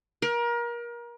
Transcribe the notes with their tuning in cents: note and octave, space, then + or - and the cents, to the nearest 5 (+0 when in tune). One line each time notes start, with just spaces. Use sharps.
A#4 +30